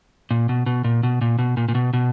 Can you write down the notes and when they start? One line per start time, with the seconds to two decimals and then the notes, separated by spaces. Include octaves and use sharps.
0.31 A#2
0.49 B2
0.66 B2
0.84 A#2
1.03 B2
1.21 A#2
1.39 B2
1.57 A#2
1.68 A#2
1.75 B2
1.93 B2